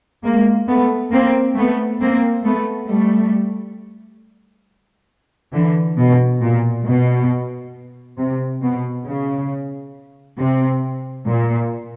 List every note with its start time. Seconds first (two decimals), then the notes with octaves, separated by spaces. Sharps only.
0.24 G#3 A#3
0.69 A3 B3
1.12 A#3 C4
1.57 A3 B3
2.01 A#3 C4
2.45 A3 B3
2.89 G3 A3
5.54 D3 E3
5.99 B2
6.42 A#2
6.87 B2
8.19 C3
8.63 B2
9.07 C#3
10.40 C3
11.28 A#2